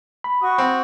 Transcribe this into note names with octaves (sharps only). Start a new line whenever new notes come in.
B5
F#4 C#6 D#6
C4